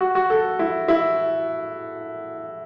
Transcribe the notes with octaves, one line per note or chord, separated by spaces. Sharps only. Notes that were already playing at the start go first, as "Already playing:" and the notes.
F#4
F#4
A4
E4
E4